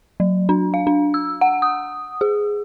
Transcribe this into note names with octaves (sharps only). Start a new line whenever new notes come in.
F#3
D4
F5
D4
E6
F#5
D#6
G#4